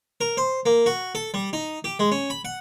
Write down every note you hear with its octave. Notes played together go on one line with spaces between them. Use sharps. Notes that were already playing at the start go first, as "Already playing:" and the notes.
A#4
C5
A#3
F#4
A4
G3
D#4
G4
G#3
C#4
B5
F#5